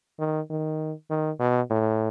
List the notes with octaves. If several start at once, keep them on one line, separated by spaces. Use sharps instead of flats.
D#3
D#3
D#3
B2
A2